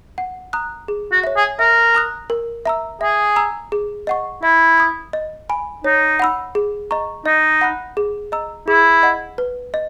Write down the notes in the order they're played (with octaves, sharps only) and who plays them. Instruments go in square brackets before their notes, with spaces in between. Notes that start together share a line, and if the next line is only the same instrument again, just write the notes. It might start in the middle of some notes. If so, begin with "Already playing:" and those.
[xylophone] F#5
A#5 D#6 F#6
G#4
[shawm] F#4
[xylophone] C#5 E5
[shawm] G#4
[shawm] A#4 [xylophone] E5
[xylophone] A#5 D#6 F#6
A#4
E5 A#5 E6
[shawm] G#4 [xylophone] E5
[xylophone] A#5 E6
G#4
D#5 F#5 C#6
[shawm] E4 [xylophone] E5
[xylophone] B5 D#6
D#5
G#5 B5
[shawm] D#4 [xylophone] C#5
[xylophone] F#5 B5 E6
G#4
D#5 A#5 C#6
[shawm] D#4 [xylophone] D#5
[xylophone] F#5 B5 F#6
G#4
D#5 A#5 E6
[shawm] E4 [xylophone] G#4
[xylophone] D#5 F#5
B4
D#5